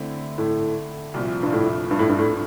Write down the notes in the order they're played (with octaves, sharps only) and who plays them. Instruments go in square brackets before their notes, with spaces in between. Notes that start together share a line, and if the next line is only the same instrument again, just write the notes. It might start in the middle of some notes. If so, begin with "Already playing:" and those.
Already playing: [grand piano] D3 A3 C4 E4
[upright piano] A2
[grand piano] C2 A#2 F3
[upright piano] G2
A2
G2
A2
G2
A2